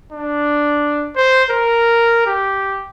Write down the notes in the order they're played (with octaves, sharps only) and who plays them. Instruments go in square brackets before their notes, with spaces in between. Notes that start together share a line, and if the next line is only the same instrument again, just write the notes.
[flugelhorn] D4
C5
A#4
G4